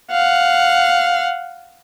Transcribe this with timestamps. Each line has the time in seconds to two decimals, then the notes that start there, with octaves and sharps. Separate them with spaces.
0.11 F5 F#5